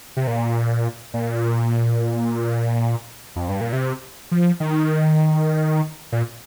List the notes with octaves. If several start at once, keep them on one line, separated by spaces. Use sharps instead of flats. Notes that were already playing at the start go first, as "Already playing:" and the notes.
C3
A#2
A#2
F2
G2
A#2
C3
F3
D#3
A#2